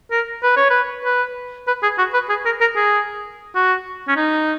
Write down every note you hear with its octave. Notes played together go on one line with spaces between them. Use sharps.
A#4
B4
C#5
B4
B4
B4
G#4
F#4
B4
G#4
A#4
A#4
G#4
F#4
C#4
D#4